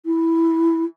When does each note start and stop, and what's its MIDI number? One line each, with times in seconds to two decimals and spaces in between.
0.05 0.84 64